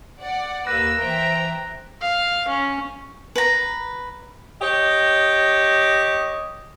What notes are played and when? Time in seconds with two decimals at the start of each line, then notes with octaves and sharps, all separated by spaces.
0.20 D5 F#5
0.67 D#2 A#3 B4 E6 F#6 A#6
0.99 E3 C5 E5 G5 A#5
2.01 F5
2.48 C#4
3.36 B4 A#5
4.62 G4 C#5 D#5